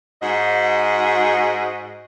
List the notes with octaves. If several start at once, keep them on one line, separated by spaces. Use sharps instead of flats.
G#2 F#4 D#5